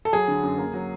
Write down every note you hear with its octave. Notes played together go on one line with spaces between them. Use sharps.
A4
F#3 G#4
D3
F#2
A#3
F#3